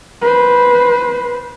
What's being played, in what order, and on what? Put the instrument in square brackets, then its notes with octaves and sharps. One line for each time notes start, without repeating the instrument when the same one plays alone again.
[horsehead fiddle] B4 C5